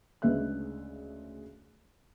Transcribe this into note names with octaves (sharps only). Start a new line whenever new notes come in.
D2 C#3 G#3 B4 E5 F#6